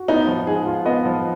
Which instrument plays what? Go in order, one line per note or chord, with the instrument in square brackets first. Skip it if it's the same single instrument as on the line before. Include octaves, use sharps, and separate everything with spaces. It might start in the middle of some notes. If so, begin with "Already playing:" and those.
Already playing: [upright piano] F#4
[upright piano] B3 [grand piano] D#4
[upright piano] F3
[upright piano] G#2 [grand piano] G#4
[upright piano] F4
[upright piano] B3 [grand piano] D#5
[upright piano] F3